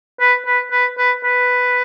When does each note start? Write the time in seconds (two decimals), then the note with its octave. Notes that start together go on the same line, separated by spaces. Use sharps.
0.20 B4
0.46 B4
0.71 B4
0.98 B4
1.24 B4